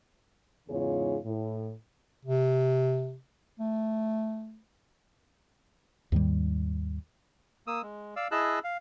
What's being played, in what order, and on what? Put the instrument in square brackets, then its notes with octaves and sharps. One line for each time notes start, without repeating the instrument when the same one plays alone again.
[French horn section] E2 G#2 C#3 F4 G#4 C#5
A2
[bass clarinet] C3
A3
[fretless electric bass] D#2 G#2 D#3 G3
[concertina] A#3 D#6 E6
G#3
D5 F5 E6
E4 G#4 D#5 A5 E6 F#6
F5